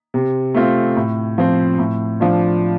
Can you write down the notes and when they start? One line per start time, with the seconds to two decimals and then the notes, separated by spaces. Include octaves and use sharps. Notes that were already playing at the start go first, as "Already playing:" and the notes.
0.14 C3
0.54 A3 C4 F4
0.96 A2
1.38 F3 C4
1.79 A2
2.20 F3 D4 F4